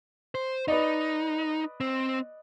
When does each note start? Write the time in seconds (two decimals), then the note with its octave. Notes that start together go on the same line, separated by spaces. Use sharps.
0.35 C5
0.68 D#4 B4 D5 D#5
1.81 C4